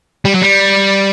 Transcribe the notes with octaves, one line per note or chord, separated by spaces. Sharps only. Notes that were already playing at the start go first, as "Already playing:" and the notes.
G3
F#3
G3